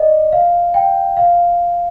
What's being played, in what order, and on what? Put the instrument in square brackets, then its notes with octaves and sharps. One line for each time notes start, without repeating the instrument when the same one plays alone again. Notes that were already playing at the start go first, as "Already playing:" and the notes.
Already playing: [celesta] D5 D#5
F5
G5
F5